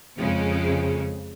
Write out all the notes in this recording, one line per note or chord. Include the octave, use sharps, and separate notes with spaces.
F2 C#3 G#3